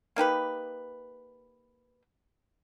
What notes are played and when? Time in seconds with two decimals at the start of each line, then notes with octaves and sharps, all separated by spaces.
0.16 A#3 D#4 G4 B4